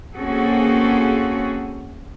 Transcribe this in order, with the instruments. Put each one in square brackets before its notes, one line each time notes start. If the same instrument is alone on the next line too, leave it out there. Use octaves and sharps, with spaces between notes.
[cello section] A#3 C4 C#4 F#4 G#4 A4